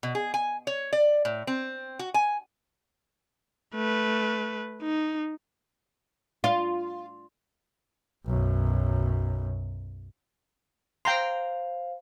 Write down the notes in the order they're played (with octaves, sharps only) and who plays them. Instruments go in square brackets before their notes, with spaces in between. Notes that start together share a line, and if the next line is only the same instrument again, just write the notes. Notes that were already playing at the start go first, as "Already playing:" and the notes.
[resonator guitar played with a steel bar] B2
G#4
G#5
C#5
D5
A2
C4
F#4
G#5
[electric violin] A3 B4
D#4
[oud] F4
[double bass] B1 F#2
[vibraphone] C5 F5 [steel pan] G5 A#5 C6